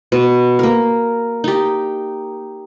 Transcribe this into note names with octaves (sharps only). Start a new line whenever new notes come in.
B2
A#3 A#4
D#4 G4